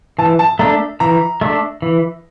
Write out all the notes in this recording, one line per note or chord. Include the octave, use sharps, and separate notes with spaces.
E3 A5
A5
A3 D4 A#5
E3 A#5
A3 D4
E3